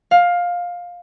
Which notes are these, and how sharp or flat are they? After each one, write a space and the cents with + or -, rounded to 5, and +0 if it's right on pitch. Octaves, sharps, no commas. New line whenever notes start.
F5 +15